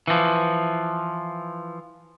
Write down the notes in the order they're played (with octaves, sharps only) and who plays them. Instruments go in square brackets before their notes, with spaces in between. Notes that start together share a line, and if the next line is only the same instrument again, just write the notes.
[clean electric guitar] E3 F3